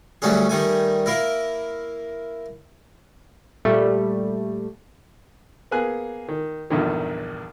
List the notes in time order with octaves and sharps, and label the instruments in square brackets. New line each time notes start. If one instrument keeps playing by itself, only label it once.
[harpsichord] D2 F#3 G3 A3 C#4 G#4
D#3 G3 A3 G#5
A#3 E4 A#4
[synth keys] A#2 G3 A3
[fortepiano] A#3 B3 G#4 G#5 F#6
D#3
A#1 E2 G2 D3 D#3